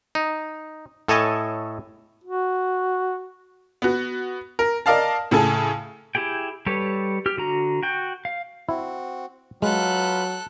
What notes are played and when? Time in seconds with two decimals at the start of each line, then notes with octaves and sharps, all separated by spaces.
0.15 D#4
1.08 A2 A4 C#5 D#5 G#5 A5
2.24 F#4
3.82 B3 F#4
4.59 A#4
4.86 A#4 D5 D#5 F5 A5
5.31 A2 C#3 A4 G#5 A5
6.15 E4 G4 G#4 G5
6.66 G3 G4 A4 B4 C#5
7.26 G4 F6
7.37 D3 F#4 A#5
7.83 F#4 G5
8.25 F5
8.69 C4 E4 F#4
9.62 F#3 G#3 F4 A4 B4 F5 F#6